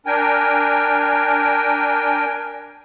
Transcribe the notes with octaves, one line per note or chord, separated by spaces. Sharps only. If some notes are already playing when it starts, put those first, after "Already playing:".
D4 A#4 G5 G#5